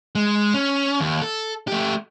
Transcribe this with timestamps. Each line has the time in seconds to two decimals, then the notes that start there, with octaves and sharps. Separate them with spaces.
0.15 G#3
0.54 C#4
1.00 D#2
1.22 A4
1.68 A3 G4